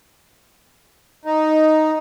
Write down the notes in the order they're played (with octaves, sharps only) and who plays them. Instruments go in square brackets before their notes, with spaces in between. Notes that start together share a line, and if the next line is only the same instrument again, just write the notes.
[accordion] D#4